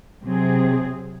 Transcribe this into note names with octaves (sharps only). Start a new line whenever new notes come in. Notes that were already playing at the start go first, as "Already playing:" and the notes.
C3 F#3 C4 G#4